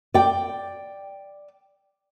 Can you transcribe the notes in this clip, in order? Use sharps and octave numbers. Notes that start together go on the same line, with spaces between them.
D5 G5